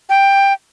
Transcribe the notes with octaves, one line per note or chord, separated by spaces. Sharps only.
G5